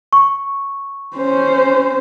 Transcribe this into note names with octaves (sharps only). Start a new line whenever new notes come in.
C#6
C#4 C5